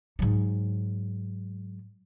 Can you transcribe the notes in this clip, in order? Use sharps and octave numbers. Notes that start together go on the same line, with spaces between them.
G#2 F#3